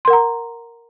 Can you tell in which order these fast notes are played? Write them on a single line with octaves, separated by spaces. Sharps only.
C6 A#4 F#5 A#5